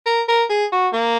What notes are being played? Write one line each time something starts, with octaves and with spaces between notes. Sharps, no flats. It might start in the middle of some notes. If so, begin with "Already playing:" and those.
A#4
A#4
G#4
F#4
A#3